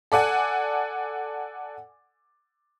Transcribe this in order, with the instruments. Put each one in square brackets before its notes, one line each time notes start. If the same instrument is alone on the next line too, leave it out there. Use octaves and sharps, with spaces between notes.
[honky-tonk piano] A4 D5 F#5 G#5